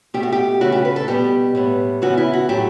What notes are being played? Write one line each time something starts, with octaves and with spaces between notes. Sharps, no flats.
B2 A3 G4
F#4
G4
C#3 E3 A3 F#4
G4
B4
A4
B2 G3 B3 G4
A2 G3 B3
C#3 E3 B3 F#4
E4
F#4
A2 F#3 A3 G4